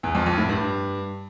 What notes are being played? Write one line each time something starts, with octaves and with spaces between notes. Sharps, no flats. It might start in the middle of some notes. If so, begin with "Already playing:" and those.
E2
F2
F2
A2
G2